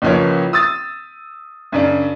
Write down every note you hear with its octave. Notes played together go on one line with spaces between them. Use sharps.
C#2 C#3 E3 F3 A#3 C#5
D#6 E6 A6
F#2 C#3 D4